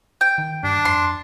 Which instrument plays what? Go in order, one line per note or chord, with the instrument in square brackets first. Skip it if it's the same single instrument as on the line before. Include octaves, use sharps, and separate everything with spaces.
[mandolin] G5
[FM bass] D#3
[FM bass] G2 [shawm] D4
[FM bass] F2 [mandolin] C6